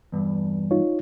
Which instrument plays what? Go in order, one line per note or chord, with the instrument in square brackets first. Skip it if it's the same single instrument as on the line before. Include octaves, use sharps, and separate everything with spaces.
[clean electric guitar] E2 G2
[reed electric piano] D#4 F4 C#5